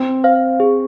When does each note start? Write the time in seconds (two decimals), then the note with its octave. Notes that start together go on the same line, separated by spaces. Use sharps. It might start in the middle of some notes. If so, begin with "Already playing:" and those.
Already playing: C4
0.24 C5 F5
0.60 G#4